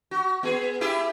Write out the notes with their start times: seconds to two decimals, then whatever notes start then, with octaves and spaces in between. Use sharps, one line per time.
0.11 F#4
0.43 B3 G#4
0.81 E4 G4 G#4